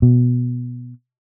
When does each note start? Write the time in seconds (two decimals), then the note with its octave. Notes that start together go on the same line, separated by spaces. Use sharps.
0.02 B2